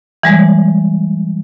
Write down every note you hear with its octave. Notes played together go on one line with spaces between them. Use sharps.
E3 G3 G#3